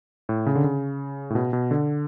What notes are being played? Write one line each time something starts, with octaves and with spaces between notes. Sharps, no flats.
A2
C#3
D3
C#3
A2
B2
B2
D3